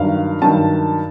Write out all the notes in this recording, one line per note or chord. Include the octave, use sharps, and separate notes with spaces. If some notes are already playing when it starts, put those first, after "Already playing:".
Already playing: G2 D#3 F#3 F5
G2 D#3 F#3 A5